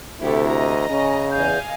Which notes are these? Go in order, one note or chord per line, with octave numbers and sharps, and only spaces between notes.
D2 C3 E4 G4 A4
D#5 A#5
C#3 C#4
E2 D#5 F5 G#5 G6